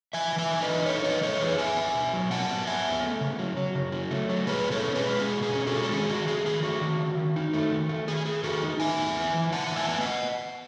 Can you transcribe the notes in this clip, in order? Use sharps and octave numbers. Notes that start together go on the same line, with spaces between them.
E3 E5 G#5
E3
E5 G#5
D#4
B4 D#5
E3
D#4 A4 C#5
E3 B4 D#5
D#4 A4 C#5
E3 G#4 B4
B3 E5 G#5
B3
B2
F#3
B2 F#5 A5
B3
F#3 E5 G#5
B3
A3
C#3
F#3
F#3
C#3
F#3
A3
F#3
B2 G#4 B4
B2
A4 C#5
C#4
G#4 B4
G#3
B2 G#4
B2
G#4
C#4
F#4 A4
G#3
A4
D#3 G#4
D#3 F#4
A3 G#4
D#3 G#4
A3 F#4
D#3
D#3
D#3
D#4
A3
D#3
A3
D#3 G#4
D#3 G#4
D#3 F#4 A4
D#4
A2 E5 G#5
B3
E4
E3
E3 F#5 A5
A2 A5
E5 G#5
B3 G#5
D#5 F#5